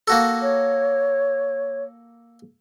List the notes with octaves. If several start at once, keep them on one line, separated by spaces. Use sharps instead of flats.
A#3 F#4 A4
C#5